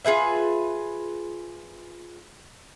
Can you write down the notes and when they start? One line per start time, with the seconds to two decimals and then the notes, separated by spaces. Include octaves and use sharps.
0.05 F4 G#4 B4 E5